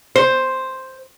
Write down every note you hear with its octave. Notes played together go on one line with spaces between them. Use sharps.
C5